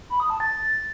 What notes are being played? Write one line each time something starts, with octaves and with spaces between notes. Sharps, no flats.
B5
D#6
A5
A6